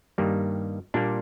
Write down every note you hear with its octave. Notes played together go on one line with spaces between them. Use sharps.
G2 D#3 G3 A#3
A#2 G3 A#3 D4